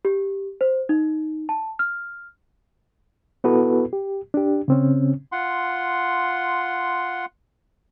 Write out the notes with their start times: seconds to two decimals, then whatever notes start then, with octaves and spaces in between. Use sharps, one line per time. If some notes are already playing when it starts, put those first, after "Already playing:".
0.05 G4
0.61 C5
0.89 D#4
1.49 A5
1.79 F6
3.44 B3 E4 F#4 A4 B4
3.93 G4
4.34 D4 G4
4.68 C#3 C4 C#4
5.32 F4 F#5 C6